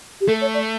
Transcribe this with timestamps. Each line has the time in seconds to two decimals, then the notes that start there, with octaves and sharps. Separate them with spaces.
0.21 G4
0.28 A3 A4
0.41 C#5
0.54 D5